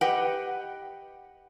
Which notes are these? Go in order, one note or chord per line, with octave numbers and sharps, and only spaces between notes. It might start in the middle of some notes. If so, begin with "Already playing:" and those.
G4 B4 D#5 F#5 G5